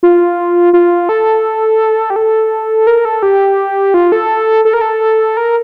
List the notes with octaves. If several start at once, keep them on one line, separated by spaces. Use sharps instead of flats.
F4
F4
A4
G4
A4
A#4
A4
G4
F4
A4
A4
A#4
A4
A#4